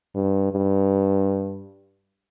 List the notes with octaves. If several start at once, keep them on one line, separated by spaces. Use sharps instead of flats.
G2
G2